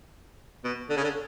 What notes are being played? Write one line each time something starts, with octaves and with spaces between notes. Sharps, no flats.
B2
D3
C#3
D3